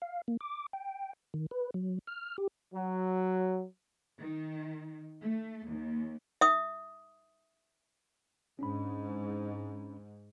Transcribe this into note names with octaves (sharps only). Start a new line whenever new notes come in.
F5
A#3
D6
G5
D#3
B4
F#3
F6
G4
F#3
D#3
A3
D#2
E5 D#6
G#2 C#4 D4 B5